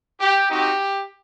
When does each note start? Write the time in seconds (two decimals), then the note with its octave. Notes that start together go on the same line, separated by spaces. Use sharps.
0.20 G4
0.49 C4 D#4 F#4 G4